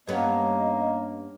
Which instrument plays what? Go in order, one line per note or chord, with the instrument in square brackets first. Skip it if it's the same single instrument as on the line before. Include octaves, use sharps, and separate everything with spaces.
[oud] G2 B3 C#4 [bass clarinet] A#3 [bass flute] D#5